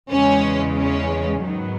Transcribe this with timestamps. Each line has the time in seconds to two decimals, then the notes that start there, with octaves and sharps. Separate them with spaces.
0.10 E2 C#3 G#3 C#4
0.78 C#4
1.44 G#2 D#3 F#3 B3